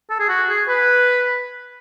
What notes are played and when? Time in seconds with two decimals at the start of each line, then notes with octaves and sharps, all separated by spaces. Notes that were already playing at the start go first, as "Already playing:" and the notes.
0.10 A4
0.19 G#4
0.29 F#4
0.49 G#4
0.68 B4